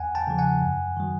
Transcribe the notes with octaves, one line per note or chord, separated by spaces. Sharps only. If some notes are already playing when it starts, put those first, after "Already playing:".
Already playing: E2 F#5 G#5
G5 A5
C#3 F3
F#5 G#5
F#2
D#3 F#3